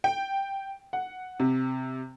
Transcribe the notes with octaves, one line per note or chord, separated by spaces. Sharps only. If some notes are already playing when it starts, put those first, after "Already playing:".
G5
F#5
C3